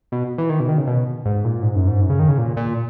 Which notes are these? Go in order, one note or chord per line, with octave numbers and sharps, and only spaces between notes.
B2
E3
D#3
B2
D#3
C#3
B2
G#2
A#2
G#2
F#2
G#2
F#2
C#3
D#3
C#3
A#2
A#2